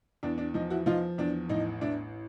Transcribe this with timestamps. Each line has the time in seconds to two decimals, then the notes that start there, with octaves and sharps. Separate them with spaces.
0.23 E2 D4
0.38 D4
0.54 F3 D#4
0.70 E4 F#4
0.86 F3 D#4 F4
1.18 E2 D4
1.49 A1 D#4
1.81 A1 D4 E4